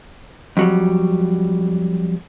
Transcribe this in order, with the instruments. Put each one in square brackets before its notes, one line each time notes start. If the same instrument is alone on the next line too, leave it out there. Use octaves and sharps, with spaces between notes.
[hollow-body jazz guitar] F2 F#3 G3